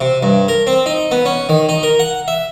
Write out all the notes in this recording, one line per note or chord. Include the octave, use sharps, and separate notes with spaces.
C3
G2
A#4
C4
D#4
B3
C#4
D#3
D#4
A#4
F#5
E5